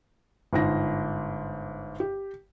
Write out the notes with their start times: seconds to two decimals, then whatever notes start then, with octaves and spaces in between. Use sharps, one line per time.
0.53 G1 G#2 A#6
2.00 G4